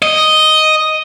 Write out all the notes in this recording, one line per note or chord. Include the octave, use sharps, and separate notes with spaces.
D#5